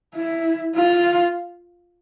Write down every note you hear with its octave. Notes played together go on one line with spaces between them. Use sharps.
E4
F4